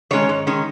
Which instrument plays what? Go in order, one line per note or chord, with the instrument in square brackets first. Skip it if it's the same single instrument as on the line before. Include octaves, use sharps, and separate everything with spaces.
[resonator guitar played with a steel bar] D#3 G#3 C#4 C#5
G#2
D#3 G#3 C#4